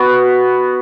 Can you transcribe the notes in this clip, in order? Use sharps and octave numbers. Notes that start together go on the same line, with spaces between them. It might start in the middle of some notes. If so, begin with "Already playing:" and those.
Already playing: B3 F#4 B4